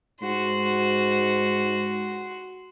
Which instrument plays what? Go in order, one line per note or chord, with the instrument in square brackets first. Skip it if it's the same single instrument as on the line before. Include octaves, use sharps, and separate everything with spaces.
[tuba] G#2 [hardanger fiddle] F#4 C6